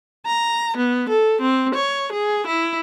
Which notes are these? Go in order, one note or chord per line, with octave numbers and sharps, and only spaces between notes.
A#5
B3
A4
C4
C#5
G#4
E4